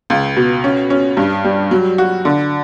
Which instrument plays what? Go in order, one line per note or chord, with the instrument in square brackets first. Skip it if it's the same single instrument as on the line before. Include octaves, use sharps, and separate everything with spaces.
[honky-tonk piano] C#2
B2
C#4
C#4
G2
G3
F#3
F#4
D3